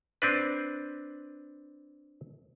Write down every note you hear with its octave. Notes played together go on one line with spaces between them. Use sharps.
C4 D4 B4